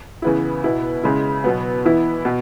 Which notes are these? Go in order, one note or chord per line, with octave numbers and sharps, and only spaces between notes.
C#3 E3 B3 E4
B2 B3 E4
C#3 G#3 E4
B2 F#3 B3
E3 B3 E4
B2